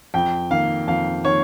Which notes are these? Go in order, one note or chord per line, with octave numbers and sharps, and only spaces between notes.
F2 G5
D#3 A#3 F5
F2 F5
D#3 A#3 C#5